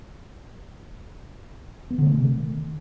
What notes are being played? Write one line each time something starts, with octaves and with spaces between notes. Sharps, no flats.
B3
D3
A3
C3
D#3